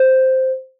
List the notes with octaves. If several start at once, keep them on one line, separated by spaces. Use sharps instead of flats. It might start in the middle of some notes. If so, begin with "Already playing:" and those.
Already playing: C5